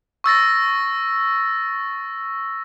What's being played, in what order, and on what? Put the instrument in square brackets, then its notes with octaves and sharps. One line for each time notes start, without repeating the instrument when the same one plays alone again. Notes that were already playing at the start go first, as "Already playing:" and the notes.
[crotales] C#6 E6 A6 A#6